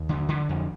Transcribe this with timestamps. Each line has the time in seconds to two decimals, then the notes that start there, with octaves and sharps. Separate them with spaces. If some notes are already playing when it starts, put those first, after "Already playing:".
Already playing: D#2
0.09 D3
0.29 D3
0.49 F2